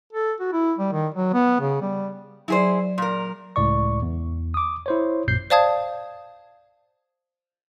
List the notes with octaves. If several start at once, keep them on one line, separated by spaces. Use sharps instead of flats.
A4
F#4
E4
G3
D#3
F#3
B3
C#3
G3
F#3 E4 G#4 C5 D5
A#2 A#4
C#2 A2 D5 C#6
E2
D6 D#6
E4 C5 C#5
A#1 F#2 A#2 G6 C7
C5 D5 F5 A5 D#6 G#6